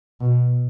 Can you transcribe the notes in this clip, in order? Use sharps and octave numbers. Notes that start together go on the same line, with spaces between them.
B2